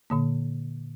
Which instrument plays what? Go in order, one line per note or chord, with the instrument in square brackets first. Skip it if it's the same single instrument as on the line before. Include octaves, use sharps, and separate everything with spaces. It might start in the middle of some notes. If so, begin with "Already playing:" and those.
[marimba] A#2 D3 A#3